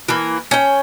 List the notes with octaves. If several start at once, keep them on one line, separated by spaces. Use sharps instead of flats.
E3 A#3
C#4 G5